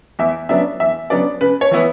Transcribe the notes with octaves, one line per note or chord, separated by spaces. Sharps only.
E2 E5
C#3 F#3 B3 D4 E5
E2 E5
C#3 F#3 B3 D4 D5
C#3 B4
C#5
E3 B3 E4